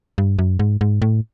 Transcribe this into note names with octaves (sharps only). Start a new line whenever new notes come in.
G2
F#2
G#2
G#2
A2